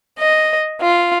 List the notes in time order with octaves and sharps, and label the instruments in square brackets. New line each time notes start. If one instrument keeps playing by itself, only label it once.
[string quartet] D#5
F4